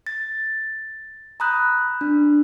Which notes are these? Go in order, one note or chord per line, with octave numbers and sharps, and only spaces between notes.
A6
A#5 B5 D#6 F#6 G6
D4